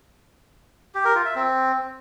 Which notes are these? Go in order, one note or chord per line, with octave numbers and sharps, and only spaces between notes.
G4
A#4
F4
E5
C4